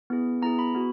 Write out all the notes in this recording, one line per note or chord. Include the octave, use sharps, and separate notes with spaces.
B3 E4 G#4
B3 E4 G#4 A#5
B5
B3 F#4